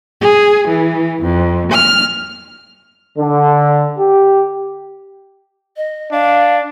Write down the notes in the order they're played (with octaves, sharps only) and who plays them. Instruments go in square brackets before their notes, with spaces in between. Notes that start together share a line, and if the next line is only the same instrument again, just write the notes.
[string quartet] G#4
E3
F2
F6
[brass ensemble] D3
G4
[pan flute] D#5
[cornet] D4 [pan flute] F5